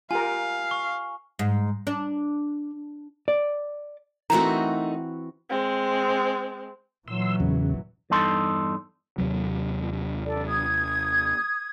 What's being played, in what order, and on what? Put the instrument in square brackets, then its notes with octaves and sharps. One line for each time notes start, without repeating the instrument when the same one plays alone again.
[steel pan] F4 G4 A#4 [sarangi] F5 [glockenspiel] G#5
[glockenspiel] C#6
[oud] G#2
D4
[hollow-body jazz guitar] D5
[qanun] E3 C4 F#4 [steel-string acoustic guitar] A3 D#4 A#4 [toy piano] A#5
[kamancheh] G#3 C4
[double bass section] A#2 E3 F#3 [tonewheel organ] C6 E6
[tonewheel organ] E2 C#3
[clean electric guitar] E2 G2 D#4 A4 C6
[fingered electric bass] D#2 C3 F#3
[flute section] A4 D5
D#6 G#6